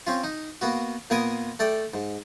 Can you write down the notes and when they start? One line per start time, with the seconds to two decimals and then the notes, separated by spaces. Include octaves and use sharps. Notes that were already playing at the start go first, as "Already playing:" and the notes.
0.07 C4 C#4 F4
0.24 D#4
0.61 A#3 B3 F#4
1.10 A#2 A#3 B3 A#4 G#5 D#6
1.59 A3 A4 D5 G5
1.94 G#2